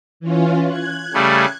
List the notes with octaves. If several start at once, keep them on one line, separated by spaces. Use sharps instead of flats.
E3 C#4 F4
F#6 G#6
C#3 G3 A3